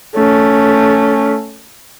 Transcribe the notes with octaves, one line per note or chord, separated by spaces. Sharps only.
A3 C#4